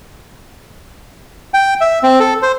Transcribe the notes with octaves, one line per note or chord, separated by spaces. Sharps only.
G5
E5
C4
A4
C5